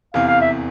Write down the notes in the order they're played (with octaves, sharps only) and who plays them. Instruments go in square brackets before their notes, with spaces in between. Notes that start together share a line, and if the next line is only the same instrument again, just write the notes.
[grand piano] F1 E2 C3 E3 [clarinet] F5
[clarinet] F5
E5